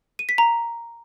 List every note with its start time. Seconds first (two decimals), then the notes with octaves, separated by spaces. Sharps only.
0.19 D#7
0.29 B6
0.38 A#5